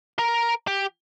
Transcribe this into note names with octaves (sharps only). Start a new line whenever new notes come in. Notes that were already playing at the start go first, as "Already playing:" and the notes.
A#4
G4